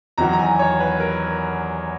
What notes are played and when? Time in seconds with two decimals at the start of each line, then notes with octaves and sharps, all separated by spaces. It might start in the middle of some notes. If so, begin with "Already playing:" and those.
0.18 E2 D#3 F#3 A#5
0.33 A#5
0.39 G#5
0.59 C#5
0.80 B4
1.00 A#4